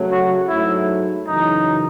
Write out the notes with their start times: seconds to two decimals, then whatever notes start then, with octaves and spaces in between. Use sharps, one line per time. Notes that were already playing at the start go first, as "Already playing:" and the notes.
Already playing: C#3 F#3 A3
0.10 F#4
0.48 G#2 F#3 A3 E4
1.26 F#2 C#3 E3 D#4